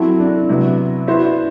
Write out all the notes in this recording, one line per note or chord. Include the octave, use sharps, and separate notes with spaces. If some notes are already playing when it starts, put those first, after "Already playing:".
Already playing: F#3 C4 E4 F#4 A4
D4
C3 F#3 B3 E4
B3 E4 F#4 C5 E5
D4